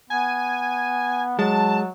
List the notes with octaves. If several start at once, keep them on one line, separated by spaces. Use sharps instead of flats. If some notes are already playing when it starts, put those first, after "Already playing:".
B3 G#5
F#3 G#3 A5